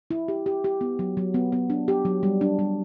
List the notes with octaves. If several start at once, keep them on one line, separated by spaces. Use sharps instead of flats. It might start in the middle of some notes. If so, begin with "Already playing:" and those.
E4
G4
G4
G4
B3
F#3
F#3
B3
B3
D4
G4
F#3
G3
D4
G3